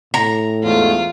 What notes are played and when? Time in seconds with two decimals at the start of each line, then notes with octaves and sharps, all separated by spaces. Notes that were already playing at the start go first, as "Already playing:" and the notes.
0.14 A2 A#5
0.63 E2 G#2 A3 F4